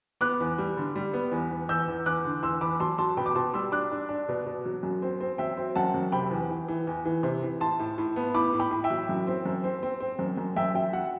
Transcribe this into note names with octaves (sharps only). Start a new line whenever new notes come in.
B3 D6 F#6
E2
G3
D3
G3
B3
E2
E2
E2 E6 G6
E2
E2 D6 F#6
D3
E2 C6 E6
E2 B5 D6
F#3 A5 C6
F#3 A5 C6
B2 G5 B5
D6
B2 A5 C6
G3 C6 E6
D4 D6 F#6
D4
D4
B2
B2
F#3
F#2
C4
C4
F#3 E5 G5
C4
F#2 F#5 A5
F#2
C3 G5 B5
E2
E3
E3
E2
E3
C3
E3
A2 A5 C6
A2
A2
B3
A2 B5 D6
A2
G5 B5
A2
E5 G5
F#3
F#2
C4
F#2
C4
C4
C4
F#2
F#2
F#2 E5 G5
F#3 E5 G5
F#3 F#5